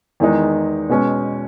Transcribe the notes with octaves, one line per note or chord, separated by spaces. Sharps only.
E2 D#3 G#3 D#4
B2 G#3 C#4